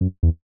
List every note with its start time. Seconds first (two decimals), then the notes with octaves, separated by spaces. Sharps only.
0.01 F#2
0.23 E2